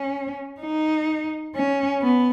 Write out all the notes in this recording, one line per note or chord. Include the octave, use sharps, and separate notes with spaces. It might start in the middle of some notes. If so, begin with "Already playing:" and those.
Already playing: C#4
D#4
C#4
B3